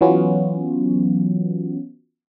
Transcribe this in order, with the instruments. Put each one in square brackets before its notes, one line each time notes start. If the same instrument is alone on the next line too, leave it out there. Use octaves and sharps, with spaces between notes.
[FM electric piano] E3 F#3 B3 C#4 F4 F#4